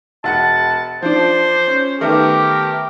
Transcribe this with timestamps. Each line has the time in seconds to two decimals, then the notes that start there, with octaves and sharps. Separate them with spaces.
0.24 E1 F#5 A5 C#7
1.02 F3 D4 C5
1.67 C#4
2.01 D#3 A3 B3 G4 A#4